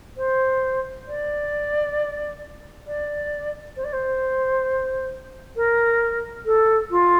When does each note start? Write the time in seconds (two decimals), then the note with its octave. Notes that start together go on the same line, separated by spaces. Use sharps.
0.16 C5
1.07 D5
2.87 D5
3.76 C5
3.84 D5
3.93 C5
5.56 A#4
6.45 A4
6.90 F4